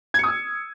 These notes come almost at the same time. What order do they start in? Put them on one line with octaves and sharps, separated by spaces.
G#6 C#7 D#6 E6